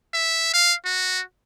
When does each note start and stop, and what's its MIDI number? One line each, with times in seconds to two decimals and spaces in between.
0.14 0.51 76
0.54 0.74 77
0.85 1.22 66